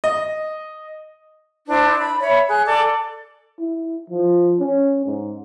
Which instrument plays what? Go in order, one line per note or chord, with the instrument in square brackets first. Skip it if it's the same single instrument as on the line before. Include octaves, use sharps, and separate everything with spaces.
[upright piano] D#5
[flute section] D4 E4 C5
B5
C#5 E5 B5
G#4 F#6
A4 D5 D6
[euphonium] E4
F3
C#4
G#2